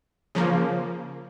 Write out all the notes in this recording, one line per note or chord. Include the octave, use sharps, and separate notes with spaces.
C#3 F3 A#3